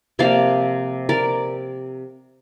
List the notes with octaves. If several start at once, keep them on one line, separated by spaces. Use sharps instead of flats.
C3 F3 A#3 D5 F5
A#4 D5